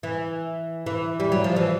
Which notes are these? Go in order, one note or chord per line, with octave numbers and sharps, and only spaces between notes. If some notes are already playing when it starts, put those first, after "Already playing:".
E3
E3
G3
F#3
F3
E3